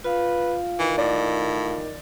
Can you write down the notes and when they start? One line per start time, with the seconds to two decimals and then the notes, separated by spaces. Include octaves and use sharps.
0.04 F4 B4 F5
0.80 D#3 E3
0.98 A2 D5